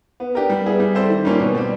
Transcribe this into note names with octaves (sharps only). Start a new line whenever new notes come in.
B3
D4 G4 A#4
G3
B3 E4 G#4
G3
C4 E4 A4 C5
D#3
G3 A#3 C#4 F4
B2
G3 C4